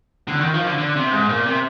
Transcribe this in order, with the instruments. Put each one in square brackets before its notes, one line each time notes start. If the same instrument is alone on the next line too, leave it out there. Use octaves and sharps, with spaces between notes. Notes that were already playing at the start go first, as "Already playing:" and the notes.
[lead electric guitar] D3
D#3
F3
D3
D3
C3
G#2
A#2
C3